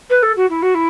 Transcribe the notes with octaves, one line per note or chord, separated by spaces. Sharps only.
B4
A4
F#4
E4
F#4
E4